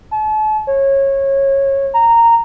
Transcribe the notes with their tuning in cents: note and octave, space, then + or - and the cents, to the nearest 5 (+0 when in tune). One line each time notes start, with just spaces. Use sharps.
A5 -40
C#5 -20
A#5 -10